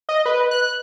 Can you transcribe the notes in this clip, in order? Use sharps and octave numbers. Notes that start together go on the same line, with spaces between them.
D#5
B4
F#6